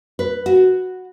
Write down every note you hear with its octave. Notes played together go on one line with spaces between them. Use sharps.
B4
F#4